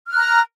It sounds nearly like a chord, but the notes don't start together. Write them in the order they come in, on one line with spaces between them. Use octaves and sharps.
F6 F#6 A#5